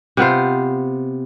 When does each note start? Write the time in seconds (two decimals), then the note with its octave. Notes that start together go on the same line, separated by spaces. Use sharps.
0.17 C3 B3 F4 C5